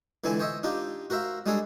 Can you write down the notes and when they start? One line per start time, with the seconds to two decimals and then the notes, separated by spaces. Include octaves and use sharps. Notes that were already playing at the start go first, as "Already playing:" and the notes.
0.24 C#2 D3 E3 C4 G#5 A5
0.39 C5 C#5 D#5 E5
0.63 D4 D#4 F4 G4
1.10 F#4 A#4 C5 E5 F5
1.46 G3 G#3 C#4 D4 G#4 A4